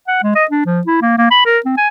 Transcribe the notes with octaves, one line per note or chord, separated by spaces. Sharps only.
F#5
G#3
D#5
D4
F3
E4
A#3
A#3
B5
A#4
C4
G#5